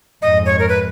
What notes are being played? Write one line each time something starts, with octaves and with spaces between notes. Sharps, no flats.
F2 G#2 D#5
C#5
A#4
B4